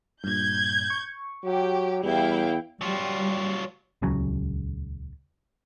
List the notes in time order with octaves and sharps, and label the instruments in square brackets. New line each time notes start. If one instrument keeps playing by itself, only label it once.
[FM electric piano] G2 A#2 [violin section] G6 G#6
[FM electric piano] C#6
[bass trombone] F#3 [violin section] G4
[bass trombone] E2 [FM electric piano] G3 [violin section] E4 F5 G5
[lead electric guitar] F#3 F4 [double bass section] G3
[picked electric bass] D#1 C#2 C#3 F#3